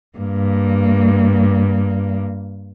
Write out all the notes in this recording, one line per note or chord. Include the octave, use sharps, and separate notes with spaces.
G2 A#3